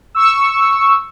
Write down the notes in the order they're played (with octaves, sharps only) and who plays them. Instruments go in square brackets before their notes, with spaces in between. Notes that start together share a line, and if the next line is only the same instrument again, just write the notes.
[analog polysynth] C#6 E6